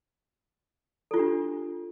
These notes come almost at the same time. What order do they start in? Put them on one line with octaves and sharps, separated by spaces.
A4 F4 G4 D4